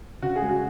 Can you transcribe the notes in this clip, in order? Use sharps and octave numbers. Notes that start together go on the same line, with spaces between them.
C#3 F#4
G#4
G#3
F#4